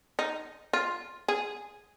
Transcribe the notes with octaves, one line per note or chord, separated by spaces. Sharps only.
D#4
F4
G#4